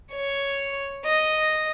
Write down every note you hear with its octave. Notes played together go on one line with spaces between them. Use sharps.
C#5
D#5